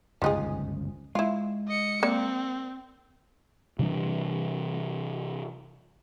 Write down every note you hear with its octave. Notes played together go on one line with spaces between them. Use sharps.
G1 C#2 F#2 F3 D#4 G#4
G#3 E4 F4
D#5 C#7
A#3 C4 D5
C3 E3 G3 D4